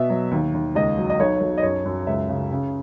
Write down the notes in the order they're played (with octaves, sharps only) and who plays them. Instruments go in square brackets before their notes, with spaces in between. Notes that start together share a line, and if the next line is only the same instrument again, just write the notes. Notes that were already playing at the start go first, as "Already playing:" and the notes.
Already playing: [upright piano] B2 E5
F#3
D#2
D#2
C#2 D#5
F#3
D#5
B1 C#5
B1
D#5
F#2 C#5
F#2
C#2 E5
C#3
C#3